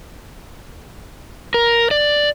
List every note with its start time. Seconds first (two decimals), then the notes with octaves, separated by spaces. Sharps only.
1.54 A#4
1.91 D5